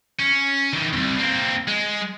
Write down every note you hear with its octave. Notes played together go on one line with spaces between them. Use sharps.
C#4
D#3 E3
C2 F2
A#3 C4
G#3